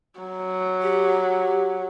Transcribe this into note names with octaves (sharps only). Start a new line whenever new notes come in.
F#3
G4